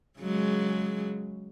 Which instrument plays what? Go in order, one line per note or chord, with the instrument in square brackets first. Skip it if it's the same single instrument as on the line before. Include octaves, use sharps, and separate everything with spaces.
[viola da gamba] C#3 F#3 G#3